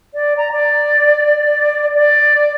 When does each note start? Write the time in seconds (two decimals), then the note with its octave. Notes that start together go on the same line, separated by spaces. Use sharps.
0.14 D5
0.37 A#5
0.51 D5
1.94 D5